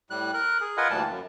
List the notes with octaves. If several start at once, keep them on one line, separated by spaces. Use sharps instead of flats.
A2 G3 F#6
A#4 F#6
G#4
F4 A#4 B4 D#5 F#5 G#5
D2 A#2 E3 G3 A5
F#2